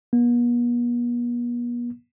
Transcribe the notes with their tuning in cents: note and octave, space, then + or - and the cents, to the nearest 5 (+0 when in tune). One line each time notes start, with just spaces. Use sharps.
B3 -45